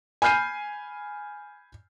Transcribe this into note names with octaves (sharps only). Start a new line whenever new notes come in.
G#5 B5 F6 G6 C7 D#7